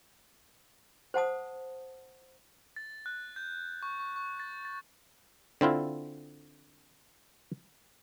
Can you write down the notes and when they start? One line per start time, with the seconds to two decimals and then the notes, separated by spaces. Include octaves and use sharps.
1.14 C5 F#5 A5 D#6
2.76 A6
3.06 F#6
3.36 G6
3.83 C#6
4.00 C#6
4.16 C#6
4.40 A6
4.65 A6
5.61 D3 C4 E4 F4